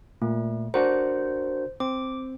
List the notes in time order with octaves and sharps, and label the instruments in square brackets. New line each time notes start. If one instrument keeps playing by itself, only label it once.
[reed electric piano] A#2 [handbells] A3
[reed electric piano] D4 F#4 A#4 [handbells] C5
[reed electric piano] C4 [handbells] D6